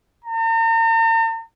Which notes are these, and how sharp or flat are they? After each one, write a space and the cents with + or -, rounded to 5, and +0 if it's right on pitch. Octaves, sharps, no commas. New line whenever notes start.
A#5 -45